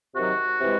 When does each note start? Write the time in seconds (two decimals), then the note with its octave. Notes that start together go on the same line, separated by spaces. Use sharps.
0.15 C3 D#3 F#3 F#4
0.60 C3 E3 G#3